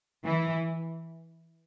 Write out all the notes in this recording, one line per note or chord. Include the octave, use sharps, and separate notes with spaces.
E3